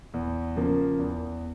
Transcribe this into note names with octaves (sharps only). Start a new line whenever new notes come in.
E2
C#3 F3 A#3
E2